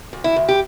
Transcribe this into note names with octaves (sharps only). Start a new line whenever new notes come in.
D2
E4
D2
G4